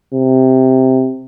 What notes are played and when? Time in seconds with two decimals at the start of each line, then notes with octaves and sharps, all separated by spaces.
0.14 C3